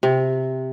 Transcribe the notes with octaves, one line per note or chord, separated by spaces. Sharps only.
C3